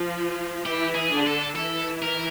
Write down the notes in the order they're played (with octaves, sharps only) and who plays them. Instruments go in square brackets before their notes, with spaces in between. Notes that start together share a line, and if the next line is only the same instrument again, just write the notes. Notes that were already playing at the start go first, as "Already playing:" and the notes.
Already playing: [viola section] F3 F4
[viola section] E3 E4 [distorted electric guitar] G4
[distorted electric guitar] G#4
[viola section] D3 D4
[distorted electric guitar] A4
[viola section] E3 E4 [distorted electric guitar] A4
[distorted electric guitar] A#4